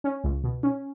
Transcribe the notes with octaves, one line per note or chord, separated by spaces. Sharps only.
C#4
C#2
B2
C#4